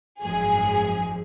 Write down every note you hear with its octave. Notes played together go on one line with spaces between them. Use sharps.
G#1 F#2 F3 G#3 G#4